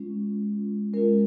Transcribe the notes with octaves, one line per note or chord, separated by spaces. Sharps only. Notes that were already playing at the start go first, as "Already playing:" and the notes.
Already playing: G#3 C#4 F4
G#3 C#4 F4
G#3 C#4 F4 A#4